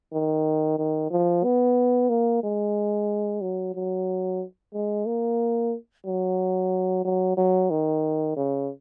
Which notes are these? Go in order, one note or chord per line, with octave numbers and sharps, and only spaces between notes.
D#3
D#3
F3
B3
A#3
G#3
F#3
F#3
G#3
A#3
F#3
F#3
F#3
D#3
C#3